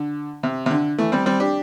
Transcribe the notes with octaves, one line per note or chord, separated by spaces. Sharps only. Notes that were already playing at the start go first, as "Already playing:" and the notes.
Already playing: D3
C3
C3
D3
E3 A3
G3 C4
G3 C4
D4 G4